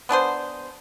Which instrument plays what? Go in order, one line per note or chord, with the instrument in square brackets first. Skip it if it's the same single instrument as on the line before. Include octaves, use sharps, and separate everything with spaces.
[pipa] B3 D4 G#4 C5